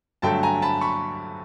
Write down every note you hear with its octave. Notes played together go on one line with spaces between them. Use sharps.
G2 D3 F#3 A3 G5 A5
G#5 A#5
A5 B5
B5 C#6